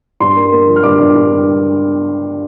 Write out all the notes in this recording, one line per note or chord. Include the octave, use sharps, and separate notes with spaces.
G2 C6
A#3
A#3
F3
F6
G2 D6
G2
G2